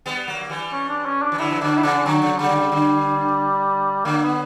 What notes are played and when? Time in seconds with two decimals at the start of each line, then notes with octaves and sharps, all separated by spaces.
0.06 G3 B3
0.27 F#3 A#3
0.41 F#3
0.49 E3 G3
0.73 C#4
0.89 D4
1.05 C#4
1.22 D4
1.32 E3
1.38 D3 F#3 E4
1.51 E3
1.61 D3 F#3 D4
1.77 E4
1.83 C#3 E3 D4
2.06 D3 F#3
2.22 C#3
2.39 C#3 G3
2.49 D3
2.56 C#3
2.72 D3
4.05 D3 F#3 A#3
4.23 B3